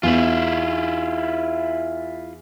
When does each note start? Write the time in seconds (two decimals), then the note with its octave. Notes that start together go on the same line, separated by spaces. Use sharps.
0.03 E2 E4 F4